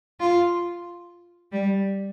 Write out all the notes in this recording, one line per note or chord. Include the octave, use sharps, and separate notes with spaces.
F4
G3